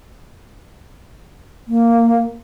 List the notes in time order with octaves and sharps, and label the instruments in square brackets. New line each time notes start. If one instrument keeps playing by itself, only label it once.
[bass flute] A#3